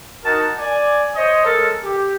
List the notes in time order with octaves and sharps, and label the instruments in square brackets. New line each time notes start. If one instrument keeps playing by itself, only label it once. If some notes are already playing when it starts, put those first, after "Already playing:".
[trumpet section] D#4 F#4 A#4 A5
D5 G#5
C5 C#5 D#5
G#3 A4 A#4
G4